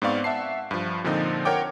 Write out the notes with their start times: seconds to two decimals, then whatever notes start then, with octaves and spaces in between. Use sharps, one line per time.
0.02 G#2 B3 C4 D5 F5 C#6
0.24 E5 F#5 A5 C7
0.71 G2 F3
1.04 A#2 D3 F3 C4 D#4
1.45 A#4 C#5 F#5 G5 D6